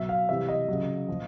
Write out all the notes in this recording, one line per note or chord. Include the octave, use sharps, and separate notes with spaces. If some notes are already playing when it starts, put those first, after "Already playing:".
Already playing: B2 F#3 E5
F5
C3 E3 G3 E5
D#5
C#3 F#3
A#2 F3